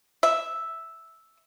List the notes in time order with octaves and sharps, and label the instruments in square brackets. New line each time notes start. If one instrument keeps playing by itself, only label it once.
[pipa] E5